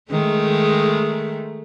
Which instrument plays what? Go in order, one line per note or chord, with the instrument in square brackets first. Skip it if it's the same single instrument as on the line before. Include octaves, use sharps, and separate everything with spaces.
[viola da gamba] D#3 G#3 A3